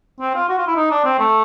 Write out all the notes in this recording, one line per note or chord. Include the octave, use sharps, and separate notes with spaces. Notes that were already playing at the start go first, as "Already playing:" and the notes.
C4
F4
F#4
F4
E4
D#4
D4
C4
A3